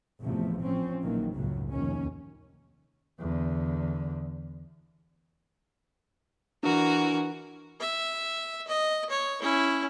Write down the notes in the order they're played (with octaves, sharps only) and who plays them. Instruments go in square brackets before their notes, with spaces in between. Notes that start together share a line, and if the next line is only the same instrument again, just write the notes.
[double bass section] A1 E2 C3 F3 A3
A2 F3 C4 C#4
A#1 D#3 E3 F#3 A#3
C#2 F#2 A2 C#3 F#3
F1 D#2 D#3 C#4
[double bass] E2 D3
[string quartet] E3 F#4 A#4 [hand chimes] D4
[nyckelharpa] E5
D#5
C#5
C#4 E4